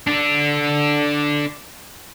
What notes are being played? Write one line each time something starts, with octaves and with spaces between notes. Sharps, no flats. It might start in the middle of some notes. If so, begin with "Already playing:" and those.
D4 A4